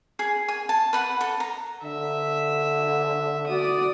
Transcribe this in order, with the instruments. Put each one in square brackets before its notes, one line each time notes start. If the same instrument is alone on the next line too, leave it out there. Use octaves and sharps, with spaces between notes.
[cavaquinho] G#4
G#5
A5
B4 F#5 B5
A4
A#5
[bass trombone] D3 [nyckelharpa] E5
[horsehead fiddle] F#4 D5 [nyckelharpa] D#6